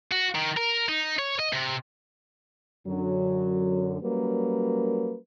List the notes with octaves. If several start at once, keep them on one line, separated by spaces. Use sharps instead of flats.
F#4
D#3
A#4
D#4
C#5
D#5
C3
F#2 D3 F#3
F#3 G3 A#3 C#4 A#4 B4